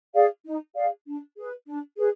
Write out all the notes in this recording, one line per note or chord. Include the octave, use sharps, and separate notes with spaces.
G#4 D5 F5
D#4
G#4 D5 F5
D4
G#4 B4
D4
G#4 B4